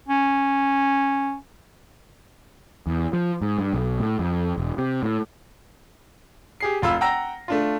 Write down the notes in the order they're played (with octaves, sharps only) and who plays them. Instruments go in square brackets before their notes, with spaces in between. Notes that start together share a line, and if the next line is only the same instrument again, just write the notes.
[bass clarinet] C#4
[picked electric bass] E2
F3
G#2
G2
B1
A2
F2
E1
C3
A2
[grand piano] G4 G#4 C7
F1 F4 B5 E6
F#5 G5 A#5 E6 A#6
A3 D4 F4